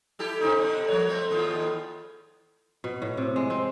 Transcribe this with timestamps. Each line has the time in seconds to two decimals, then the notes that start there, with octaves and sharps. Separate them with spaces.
0.19 E4 G4 A4
0.40 C#3 C4 D#4
0.59 B2 D3
0.88 F3 A#3 C#5
1.08 A3 C4
1.31 D#2 A2 F4
2.84 B2
3.02 A2
3.17 C3
3.36 G#3
3.50 C4